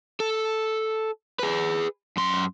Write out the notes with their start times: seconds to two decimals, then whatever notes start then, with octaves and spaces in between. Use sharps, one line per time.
0.20 A4
1.39 G#4 B4
2.17 F#2 C6